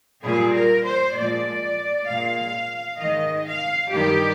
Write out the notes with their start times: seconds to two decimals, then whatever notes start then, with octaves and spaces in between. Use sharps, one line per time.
0.24 A#2 G3 G#4
0.55 A#4
0.85 C5
1.16 A#2 F3 G#3 D5
2.08 A#2 G#3 F5
2.99 G#2 D#3 G#3 D#5
3.46 F5
3.91 G2 D#3 G3 G4